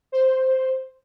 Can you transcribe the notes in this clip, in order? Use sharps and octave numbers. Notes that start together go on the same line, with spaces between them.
C5